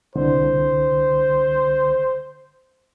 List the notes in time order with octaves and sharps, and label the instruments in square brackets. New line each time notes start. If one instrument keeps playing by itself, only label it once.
[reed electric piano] C2 D3 [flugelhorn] C5